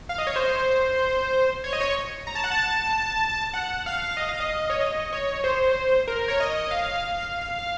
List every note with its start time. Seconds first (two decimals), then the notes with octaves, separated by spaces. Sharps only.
0.09 F5
0.18 D#5
0.27 C#5
0.36 C5
1.64 C#5
1.73 D#5
1.81 C#5
2.27 A#5
2.35 A5
2.44 F#5
2.51 A5
3.53 F#5
3.86 F5
4.17 D#5
4.29 F5
4.40 D#5
4.70 C#5
4.80 D#5
5.13 C#5
5.44 C5
6.08 A#4
6.28 C#5
6.40 D#5
6.71 F5